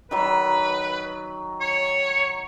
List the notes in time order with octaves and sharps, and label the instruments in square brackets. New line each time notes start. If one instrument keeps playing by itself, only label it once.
[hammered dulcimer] D#3 F#3 [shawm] B4
[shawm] C#5